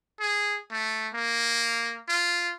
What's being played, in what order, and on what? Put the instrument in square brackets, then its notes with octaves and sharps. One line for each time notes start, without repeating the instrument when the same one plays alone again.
[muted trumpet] G#4
A3
A#3
F4